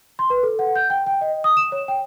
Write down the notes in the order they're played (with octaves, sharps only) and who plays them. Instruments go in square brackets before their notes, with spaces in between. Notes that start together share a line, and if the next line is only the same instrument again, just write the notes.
[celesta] C6
B4
A4
F#5
G6
G5
G5
D#5
D#6
E7
C#5
G5